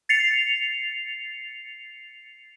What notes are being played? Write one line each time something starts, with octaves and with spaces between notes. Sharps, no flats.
A6 C7 C#7 F7